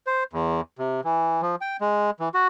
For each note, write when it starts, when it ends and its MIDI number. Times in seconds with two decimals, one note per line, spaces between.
0.07 0.24 72
0.33 0.61 40
0.79 1.01 48
1.04 1.41 52
1.42 1.56 53
1.61 1.77 79
1.81 2.10 56
2.20 2.29 52
2.34 2.48 66